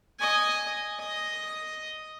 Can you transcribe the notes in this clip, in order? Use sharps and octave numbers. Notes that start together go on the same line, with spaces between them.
D#5 G#5
D#5